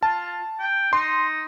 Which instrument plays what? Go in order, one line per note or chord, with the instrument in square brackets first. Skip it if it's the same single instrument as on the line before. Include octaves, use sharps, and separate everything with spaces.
[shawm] F4 [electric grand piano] A5
[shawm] G5
[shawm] D#4 [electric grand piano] C6